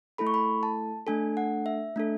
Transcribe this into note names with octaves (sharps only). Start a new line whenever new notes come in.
A3 E4 A4 B5
C#6
B5
A5
A3 D4 A4 G#5
F#5
E5
A3 D4 A4